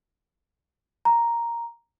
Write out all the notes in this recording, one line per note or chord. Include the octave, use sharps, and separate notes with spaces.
A#5